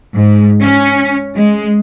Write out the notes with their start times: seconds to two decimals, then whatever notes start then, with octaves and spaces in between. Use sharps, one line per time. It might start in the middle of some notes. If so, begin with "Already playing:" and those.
0.14 G#2
0.60 C#4
1.35 G#3